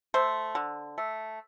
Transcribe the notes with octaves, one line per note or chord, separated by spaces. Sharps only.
A3 C5
D3
A3